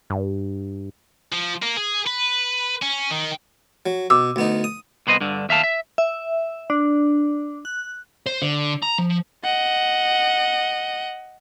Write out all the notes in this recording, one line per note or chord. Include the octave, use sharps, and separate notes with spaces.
G2
F3
A#3
G#4
B4
C#4
D#3
F#3
B2 D6 E6
D2 B3 D#4
D#6
C2 B3 C5 D#5
G2 D3
D#2 E5 F5 A5
E5
E5
D4
F#6
C5
D3
A#5
F3
D#5 F#5